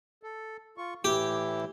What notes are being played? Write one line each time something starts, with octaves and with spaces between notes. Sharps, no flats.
A4
F4 C#6
A2 E3 E4 G4